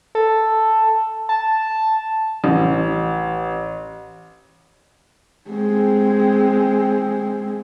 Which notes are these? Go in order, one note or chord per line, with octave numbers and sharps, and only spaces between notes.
A4
A5
A1
G#3 C4